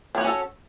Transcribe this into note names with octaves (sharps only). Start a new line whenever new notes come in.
C#4 D4 F#4 A4 C#5